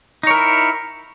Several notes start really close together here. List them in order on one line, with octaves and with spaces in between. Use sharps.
D#4 C#5 A#4 E4